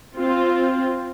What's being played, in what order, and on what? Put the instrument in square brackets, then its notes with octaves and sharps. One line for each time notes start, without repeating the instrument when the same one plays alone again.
[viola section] C4 F4